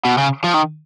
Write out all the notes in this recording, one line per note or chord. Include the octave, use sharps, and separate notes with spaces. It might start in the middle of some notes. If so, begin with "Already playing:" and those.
B2
C#3
F3
D#3